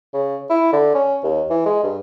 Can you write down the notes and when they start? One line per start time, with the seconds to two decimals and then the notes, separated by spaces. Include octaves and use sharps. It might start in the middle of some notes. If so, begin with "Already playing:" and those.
0.13 C#3
0.50 E4
0.73 D3
0.94 C#4
1.23 D#2
1.50 E3
1.66 G#3
1.84 G2